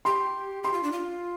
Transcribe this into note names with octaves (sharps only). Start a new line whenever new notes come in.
G4 C6
G4 C6
F4
D4
F4